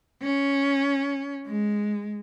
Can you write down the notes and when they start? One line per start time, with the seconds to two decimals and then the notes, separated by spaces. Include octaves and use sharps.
0.23 C#4
1.47 G#3